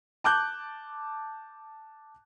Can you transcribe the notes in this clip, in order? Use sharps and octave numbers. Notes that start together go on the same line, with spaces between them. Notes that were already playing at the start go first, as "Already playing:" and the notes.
A5 D6 F#6 G6